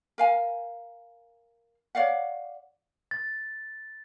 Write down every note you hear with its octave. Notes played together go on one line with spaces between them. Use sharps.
A#4 F5 G#5
C#5 D5 F5 F#5
A6